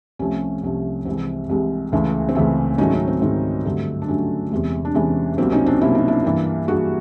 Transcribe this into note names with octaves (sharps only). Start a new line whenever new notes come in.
C2 C3 F3 A3 C#4
C2 C3 F3 A3
C2 C3 E3 G#3 C4
C2 C3 E3 G#3
C#2 C#3 E3 A3
C4
C#2 C#3 E3 A3 C#4
G#2 D#3 F#3 A3 C#4 D#4
C#4
C4
G#2 D#3 F#3 A3 C4
G2 D3 F#3 A3
D4
G2 D3 F#3 A3 C#4
E2 C3 E3 G#3
D4
E2 C3 E3 G#3 C#4
C2 B2 F#3 A#3 C4
C#4 D#4
C4 D4
C2 B2 F#3 A#3 E4
D#4
D4 E4
G2 E3 G3 A#3
G2 E3 G3 A#3 F#4 G#4